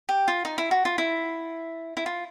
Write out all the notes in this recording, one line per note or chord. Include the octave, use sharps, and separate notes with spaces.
G4
F4
D#4
E4
F#4
F4
E4
E4
F4